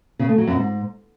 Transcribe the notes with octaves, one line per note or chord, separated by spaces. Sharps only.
C#3
A3
F#3
F#2
G#2